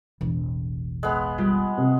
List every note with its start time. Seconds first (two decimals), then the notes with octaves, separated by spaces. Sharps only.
0.21 E1 A1
1.03 G#3 B3 F5 F#6
1.38 G3 F4 G4
1.78 C3